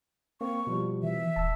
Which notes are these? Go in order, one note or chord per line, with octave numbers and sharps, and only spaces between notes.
A#3 C4 C#6
B2 F3 G3
E3 E5
D#1 A5 E6